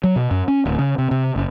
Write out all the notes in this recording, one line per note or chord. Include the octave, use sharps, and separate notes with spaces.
F#3
B2
F#2
C#4
D1
C#3
C3
C3
F#1